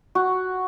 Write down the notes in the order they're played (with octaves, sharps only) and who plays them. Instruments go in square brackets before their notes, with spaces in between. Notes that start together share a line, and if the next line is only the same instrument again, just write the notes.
[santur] F#4